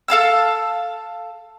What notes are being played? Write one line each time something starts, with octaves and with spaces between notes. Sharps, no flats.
A4 F5 A5 E6